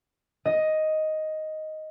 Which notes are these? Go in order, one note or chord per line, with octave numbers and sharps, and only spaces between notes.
D#5